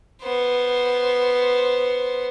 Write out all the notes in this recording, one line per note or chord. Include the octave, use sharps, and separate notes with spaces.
B3 C5